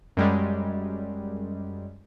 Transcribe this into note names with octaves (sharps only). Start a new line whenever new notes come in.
F#2 G3 G#3